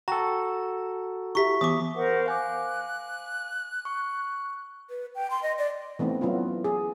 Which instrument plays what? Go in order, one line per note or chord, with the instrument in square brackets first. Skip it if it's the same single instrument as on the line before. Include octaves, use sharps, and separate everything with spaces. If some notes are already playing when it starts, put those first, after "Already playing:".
[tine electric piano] F#4 A4 [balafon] G5 [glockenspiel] A#5
[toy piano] E4 G4 E5 [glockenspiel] C#6 B6
[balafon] E3 B3 [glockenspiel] D6 D#6
[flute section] A#4 C5 F#5
[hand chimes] F5 G#5 D6 [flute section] F#6
[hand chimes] C#6
[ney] B4
G5
C6
D#5
D5
[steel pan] E3 A3 B3 C4 D#4
F#3 B3 C#4 E4 F4
G#4